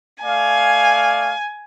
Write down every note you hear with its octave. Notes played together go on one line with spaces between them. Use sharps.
A3 D5 F5 G#5